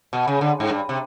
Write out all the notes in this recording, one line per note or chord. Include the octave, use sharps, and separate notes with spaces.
B2
C#3
D3
G#2
G2
C3